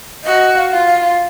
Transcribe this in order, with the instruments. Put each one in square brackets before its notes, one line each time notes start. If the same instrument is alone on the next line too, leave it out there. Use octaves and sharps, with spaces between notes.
[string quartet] F#4 [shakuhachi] D#5
[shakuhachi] F5
[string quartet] F4
[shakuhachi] F5